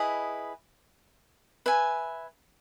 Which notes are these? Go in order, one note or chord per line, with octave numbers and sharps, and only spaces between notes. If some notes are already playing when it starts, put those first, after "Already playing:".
Already playing: E4 G#4 B4 D#5
B4 E5 G#5